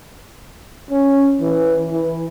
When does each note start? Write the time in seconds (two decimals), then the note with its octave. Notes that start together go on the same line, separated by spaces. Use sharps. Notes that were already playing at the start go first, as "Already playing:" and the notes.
0.90 C#4
1.41 E3
1.91 E3